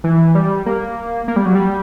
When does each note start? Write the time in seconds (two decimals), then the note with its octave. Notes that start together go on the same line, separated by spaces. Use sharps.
0.04 E3
0.35 G3
0.66 A#3
1.28 A#3
1.36 G3
1.46 F#3
1.55 G3